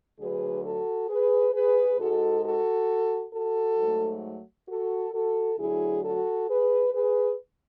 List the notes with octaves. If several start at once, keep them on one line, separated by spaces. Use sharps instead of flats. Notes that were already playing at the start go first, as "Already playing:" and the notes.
D2 D3 F#3 G#4 B4
F#4 A4
G#4 B4
G#4 B4
G#2 G#3 F#4 A4
F#4 A4
F#4 A4
G#2 F#3 A3
F#4 A4
F#4 A4
D2 D3 F#3 E4 G#4
F#4 A4
G#4 B4
G#4 B4